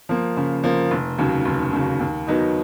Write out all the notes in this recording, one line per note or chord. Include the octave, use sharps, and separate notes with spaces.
F3 A#3
C#3
F3 A#3
F1
D#2 C#3 F#3
F1
D#2 C#3 F#3
D#2
D#3 F#3 B3 D#4